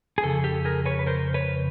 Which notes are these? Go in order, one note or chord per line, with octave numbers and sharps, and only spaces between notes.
G#4
F2 C#3 A4
G4 A4
G#4 A#4
B4 C#5
B4
A#4 C5
B4 C#5